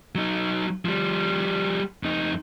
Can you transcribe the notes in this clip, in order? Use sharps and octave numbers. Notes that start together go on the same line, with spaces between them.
F#3 D#4
F3 G3
F2 D#4